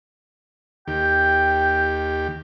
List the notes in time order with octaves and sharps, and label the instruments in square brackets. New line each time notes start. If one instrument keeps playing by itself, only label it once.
[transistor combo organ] D#2 G4 [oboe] G5